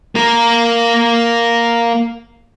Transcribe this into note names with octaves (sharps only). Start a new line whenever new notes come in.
A#3 A#4